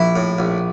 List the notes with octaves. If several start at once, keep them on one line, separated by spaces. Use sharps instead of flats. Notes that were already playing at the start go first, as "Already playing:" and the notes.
Already playing: A#1 E4
A2
A#1